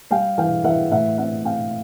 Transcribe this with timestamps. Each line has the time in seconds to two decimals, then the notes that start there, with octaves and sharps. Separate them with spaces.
0.11 G3 F5 G5
0.38 E3 F5 G5
0.64 E3 E5 F#5
0.91 A2 E5 F#5
1.18 C4 E5 F#5
1.45 C4 F5 G5